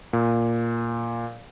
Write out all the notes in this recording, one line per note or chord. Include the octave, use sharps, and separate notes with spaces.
A#2